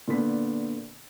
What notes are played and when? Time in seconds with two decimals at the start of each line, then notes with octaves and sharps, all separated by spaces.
0.08 A#2 D3 B3 B6